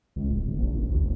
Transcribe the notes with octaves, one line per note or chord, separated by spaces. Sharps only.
C#2
D1
D1
A#1
A1
D2
E1